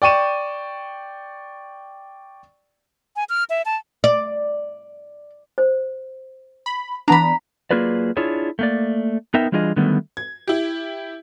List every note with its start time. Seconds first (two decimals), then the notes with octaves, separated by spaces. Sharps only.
0.02 D5 G5 C#6 D#7 E7
3.16 G#5
3.29 F6
3.50 E5
3.66 A5
4.04 D5
5.58 C5
6.66 B5
7.08 E3 B3 D4 A#5 B5
7.71 F#3 A#3 F4 G#4 B4 D5
8.17 D4 E4 F4 G#4 C#5
8.59 A3 A#3 D5
9.34 B3 D#4 A#4 E5 G5
9.52 E3 G3 D4 F4 G#4 D#5
9.76 D3 D#3 F#3 G3 A3 B3
10.17 G#6
10.48 E4 G4